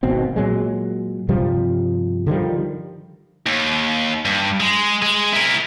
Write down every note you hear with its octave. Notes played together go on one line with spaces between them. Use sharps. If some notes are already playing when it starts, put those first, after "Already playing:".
G#1 B2 C4
A#2 F#3 G#3
G2 C3 F3 G3
D3 D#3 F3 G3
D#2
G2
G#3
G#3
E4 A#4